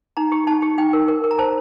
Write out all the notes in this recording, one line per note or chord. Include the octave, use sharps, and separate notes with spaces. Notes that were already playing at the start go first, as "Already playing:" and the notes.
D#4 A#5
G4
D#4 A5
G4
D#4 G5
A#4
A#4
A#4
A#5
C5 A5